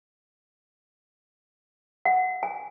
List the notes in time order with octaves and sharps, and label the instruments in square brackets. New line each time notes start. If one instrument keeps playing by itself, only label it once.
[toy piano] F#5
G#5